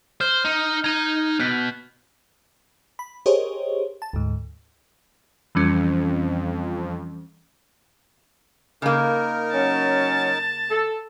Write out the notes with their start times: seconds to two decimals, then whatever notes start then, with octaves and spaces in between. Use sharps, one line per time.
0.21 C5 F6 G6 G7
0.45 D#4
0.84 D#4 A#5 G#6 D#7
1.40 B2 F#6 G6 B6
2.99 B5
3.26 G4 G#4 A#4 C5 C#5 D#5
4.02 A5
4.13 D2 G#2
5.55 F2 E3 G3 C#4
8.82 C#3 A#3 D#4 A#4
9.53 F#3 C#4 A5
10.70 A4